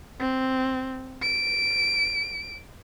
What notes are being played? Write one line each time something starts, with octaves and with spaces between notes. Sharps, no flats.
C4
D7